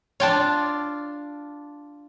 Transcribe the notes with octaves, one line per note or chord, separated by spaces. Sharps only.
D4 F4 C#5 G5 A5